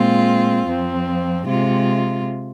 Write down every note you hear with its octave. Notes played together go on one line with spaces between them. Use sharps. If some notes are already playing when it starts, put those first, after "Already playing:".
Already playing: A#2 G#3 C4 F4
F2 F3 C4
C3 G#3 F4